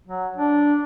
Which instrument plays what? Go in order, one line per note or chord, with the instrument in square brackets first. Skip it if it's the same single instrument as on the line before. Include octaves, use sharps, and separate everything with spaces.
[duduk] F#3
D4